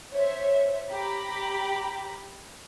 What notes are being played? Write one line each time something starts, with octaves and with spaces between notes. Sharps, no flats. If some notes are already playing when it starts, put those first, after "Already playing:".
C5 C#5 E5
G4 A#5 B5